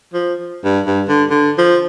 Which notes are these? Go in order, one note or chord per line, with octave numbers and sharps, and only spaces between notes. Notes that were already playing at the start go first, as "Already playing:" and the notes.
F3
G2
G2
D3
D3
F3